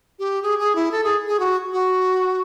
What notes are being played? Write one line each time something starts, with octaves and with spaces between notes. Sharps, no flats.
G4
G#4
G#4
E4
A4
G#4
G#4
F#4
F#4